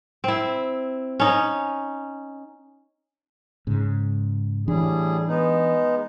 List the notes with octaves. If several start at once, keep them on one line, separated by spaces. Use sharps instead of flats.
C4 E4
C#4 D#4
G#2 C#3
A2 E3 G3 D4 G#4
G#3 B3 D#4